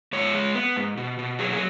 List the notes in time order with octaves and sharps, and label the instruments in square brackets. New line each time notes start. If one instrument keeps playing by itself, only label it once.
[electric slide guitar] G#2 C#5
G#3
B3
G#2
B2
B2
F#3 G#4
G#4